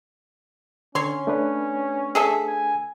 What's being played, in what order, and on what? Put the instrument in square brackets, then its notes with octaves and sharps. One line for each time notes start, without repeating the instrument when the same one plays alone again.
[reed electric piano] D3 [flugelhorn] C#4 [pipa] C#5 C6
[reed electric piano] A3 D4 B4
[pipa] G#4 A4 E5
[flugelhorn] G#5